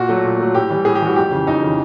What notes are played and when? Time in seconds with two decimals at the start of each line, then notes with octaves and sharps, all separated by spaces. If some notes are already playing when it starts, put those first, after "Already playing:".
Already playing: A#2 F#4
0.09 F#3 A3
0.24 A#2
0.39 F#3 A3
0.54 A2 G4
0.70 E3 G3
0.85 A2 G#4
0.95 G4
1.02 E3 G3 F#4
1.16 F2 G4
1.31 C#3 E3
1.47 F2 D#4
1.63 C#3 E3